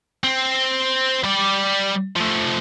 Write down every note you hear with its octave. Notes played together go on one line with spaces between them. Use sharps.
C4
G3 D5
F3 A3